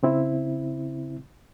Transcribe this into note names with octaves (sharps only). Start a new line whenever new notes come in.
C#3 C4 E4